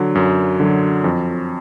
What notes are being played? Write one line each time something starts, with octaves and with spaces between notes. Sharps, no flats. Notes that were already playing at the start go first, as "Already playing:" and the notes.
Already playing: D3 F#3
F#2
D3 F#3
F2